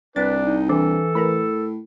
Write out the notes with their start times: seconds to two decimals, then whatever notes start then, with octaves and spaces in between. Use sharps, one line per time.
0.16 C2 D4 B4 A6
0.45 D#4
0.69 E3 D4 A4 C5
1.15 A2 A#4 B4 B5